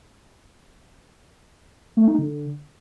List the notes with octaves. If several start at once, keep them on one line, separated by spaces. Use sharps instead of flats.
A3
D#4
D3